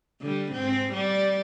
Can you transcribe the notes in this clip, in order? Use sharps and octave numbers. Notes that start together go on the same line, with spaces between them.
D3 G3
G#2 C4
G3 D5